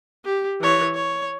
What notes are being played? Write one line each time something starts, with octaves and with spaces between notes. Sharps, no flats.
G4
E3 C#5
C#5